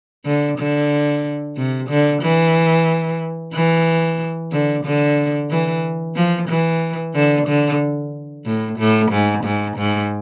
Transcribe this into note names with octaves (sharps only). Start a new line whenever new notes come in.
D3
D3
C3
D3
E3
E3
D3
D3
E3
F3
E3
D3
D3
A2
A2
G#2
G#2
G#2